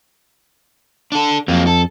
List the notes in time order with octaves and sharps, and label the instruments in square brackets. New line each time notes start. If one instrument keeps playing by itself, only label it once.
[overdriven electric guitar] D4 A4
[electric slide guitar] F2 [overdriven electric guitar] F#3 A#3
[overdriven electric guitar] A4